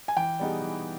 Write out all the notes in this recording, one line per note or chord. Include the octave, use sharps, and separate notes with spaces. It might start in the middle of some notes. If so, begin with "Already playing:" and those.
G#5
E3 G5
G3 B3 D#4 G#4
E3